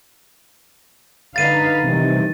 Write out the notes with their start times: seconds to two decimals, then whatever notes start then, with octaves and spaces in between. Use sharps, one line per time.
1.36 D3 D#4 B4 F5 A6 D#7
1.84 C3 D#3 E3 G3 A3